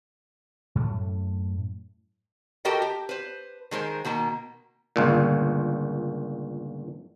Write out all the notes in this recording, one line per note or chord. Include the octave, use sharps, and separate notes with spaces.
F#2 A2 A3
F#4 G4 A4 A#4 D#5 G5
G4
B4 C5
D#3 G#3 A#4 C5
B2 D#3 A#3 A#5
G1 C#2 A#2